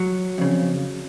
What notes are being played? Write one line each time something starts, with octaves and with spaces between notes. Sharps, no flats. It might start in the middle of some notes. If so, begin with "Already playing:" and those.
Already playing: F#3
F2 C#3